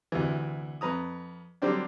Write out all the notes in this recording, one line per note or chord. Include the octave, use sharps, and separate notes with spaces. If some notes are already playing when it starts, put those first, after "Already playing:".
D2 C3 E3
F2 B4 A#5 D#6
D3 F#3 G3 C4 D4